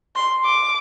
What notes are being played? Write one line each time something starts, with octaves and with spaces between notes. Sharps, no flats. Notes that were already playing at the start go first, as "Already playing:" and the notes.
C6
D6